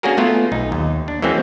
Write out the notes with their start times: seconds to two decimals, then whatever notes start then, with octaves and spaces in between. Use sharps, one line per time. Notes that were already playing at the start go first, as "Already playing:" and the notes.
0.03 A#3 C#4 D4 F#4 G#4 A#4
0.17 A3 B3 F4
0.52 B1 D#4
0.72 D#2
1.08 D4
1.22 E3 G#3 A#3 C4 C#4 F#4